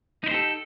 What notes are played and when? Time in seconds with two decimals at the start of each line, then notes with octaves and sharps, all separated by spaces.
0.24 D#4
0.26 E4
0.29 C5
0.31 G4
0.34 A4